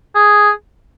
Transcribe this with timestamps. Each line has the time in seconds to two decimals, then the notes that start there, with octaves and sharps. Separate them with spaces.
0.15 G#4